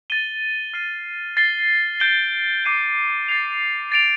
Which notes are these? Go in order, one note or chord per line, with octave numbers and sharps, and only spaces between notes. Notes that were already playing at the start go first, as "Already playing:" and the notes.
A6 D#7 G7
F6 C7 D#7 G7
A6 C7 G7
G6 D7 G7
D6 G6 C7 D#7 G7
A6 C7 F7
A6 D7 F7